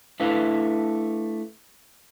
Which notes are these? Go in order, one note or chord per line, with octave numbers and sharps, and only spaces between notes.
A3 D4 E4 B4 F5